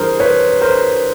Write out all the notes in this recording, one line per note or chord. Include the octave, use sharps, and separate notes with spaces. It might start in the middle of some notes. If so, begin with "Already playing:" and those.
Already playing: G2 E3 G3 G#4 A#4 C5
B4 C#5
A#4 C5